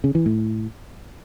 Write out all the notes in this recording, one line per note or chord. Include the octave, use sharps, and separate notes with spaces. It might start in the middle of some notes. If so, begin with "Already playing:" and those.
C#3
E3
A2